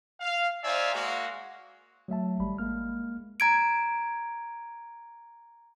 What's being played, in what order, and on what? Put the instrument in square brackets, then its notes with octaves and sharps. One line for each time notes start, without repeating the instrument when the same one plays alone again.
[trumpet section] F5
D#4 C5 D5 E5 F5 G#5
G#3 A#3 F#4
[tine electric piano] F#3 A3 E5 A5
G#1 G3 B5
G#3 A#3 F6
[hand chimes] A#5 G#6 D7